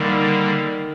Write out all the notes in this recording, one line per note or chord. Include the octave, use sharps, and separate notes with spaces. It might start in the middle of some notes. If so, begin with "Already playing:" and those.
Already playing: D3 D#3 G3 A#3